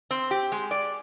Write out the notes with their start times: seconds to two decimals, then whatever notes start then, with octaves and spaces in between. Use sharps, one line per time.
0.11 C4
0.31 G4
0.52 G#3
0.71 D5